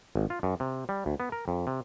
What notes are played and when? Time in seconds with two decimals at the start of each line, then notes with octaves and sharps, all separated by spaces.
0.16 G#1
0.30 F4
0.43 F#2
0.60 C3
0.89 G3
1.06 D2
1.20 B3
1.32 A#4
1.48 F2
1.67 C3